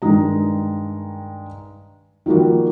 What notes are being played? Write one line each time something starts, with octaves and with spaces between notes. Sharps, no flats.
G2 D#3 G#3 A#5
D#3 F3 G3 A#3 F#4